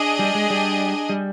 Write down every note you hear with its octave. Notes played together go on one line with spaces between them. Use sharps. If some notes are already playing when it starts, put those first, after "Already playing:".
Already playing: D4 G#4 D#5
G3
G#3
G3
G3